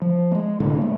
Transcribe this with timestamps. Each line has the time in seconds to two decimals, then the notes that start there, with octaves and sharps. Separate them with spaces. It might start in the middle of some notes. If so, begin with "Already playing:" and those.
0.02 F3
0.32 G#3 A#3
0.60 C2 A2 D3
0.77 G#3 A#3